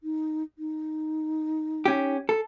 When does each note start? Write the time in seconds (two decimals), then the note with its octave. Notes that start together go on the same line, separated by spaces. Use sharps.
0.03 D#4
0.58 D#4
1.85 C#4 G4
2.29 A4